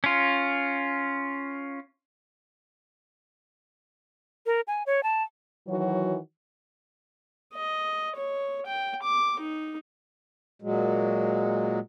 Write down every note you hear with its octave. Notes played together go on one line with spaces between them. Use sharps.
C#4 F4
A#4
G#5
C#5
A5
D#3 E3 F#3 F#4 C#5
D#5
C#5
G5
D6
D#4
A#2 F#3 G#3